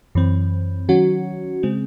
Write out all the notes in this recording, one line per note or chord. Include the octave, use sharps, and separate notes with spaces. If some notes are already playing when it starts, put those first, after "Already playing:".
F#2 E3 C4
D#3 F#3 C#4 F#4
C#3 G#3 C4